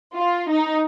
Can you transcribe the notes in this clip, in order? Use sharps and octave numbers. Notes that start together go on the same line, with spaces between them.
F4
D#4